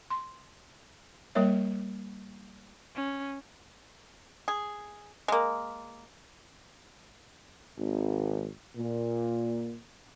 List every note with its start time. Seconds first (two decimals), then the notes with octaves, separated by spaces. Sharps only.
0.10 C6
1.35 G3 A#3 A#4 C#5 E5
2.96 C#4
4.48 G#4
5.28 G#3 A#3
7.78 G#1
8.75 A#2